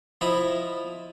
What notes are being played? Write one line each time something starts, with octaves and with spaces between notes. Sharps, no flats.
F3 E4 D#5 B5